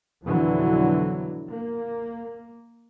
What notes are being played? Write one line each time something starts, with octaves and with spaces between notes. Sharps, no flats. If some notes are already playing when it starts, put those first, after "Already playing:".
F2 B2 D3 E3 F#3
A#3